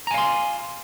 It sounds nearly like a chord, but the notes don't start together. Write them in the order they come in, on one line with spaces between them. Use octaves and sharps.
A#5 G#5 F5 C6